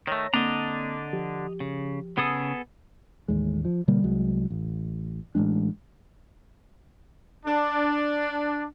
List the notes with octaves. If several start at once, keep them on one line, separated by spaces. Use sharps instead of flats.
D#3 A3 C#5 A#5 A#6
D3 A#3 C4 D4 D#5 A#5
F3 G4
C#3
C#3 B3 G#4 A4 D#6
A1 D#2 G#3
F3
B2 D3 G3 A#3
C2 F#3 G#3
A1
A1 F3 G#3 D4
D4